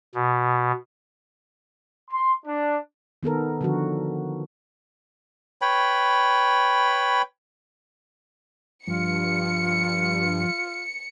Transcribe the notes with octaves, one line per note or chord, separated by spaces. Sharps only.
B2
C6
D4
D#3 B3 A4 A#4
D3 F3 F#4
B4 C#5 G5 B5
G2 F3 F4 C#7